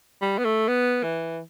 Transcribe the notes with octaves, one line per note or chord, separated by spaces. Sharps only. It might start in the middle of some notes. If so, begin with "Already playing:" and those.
G3
B3
A3
B3
E3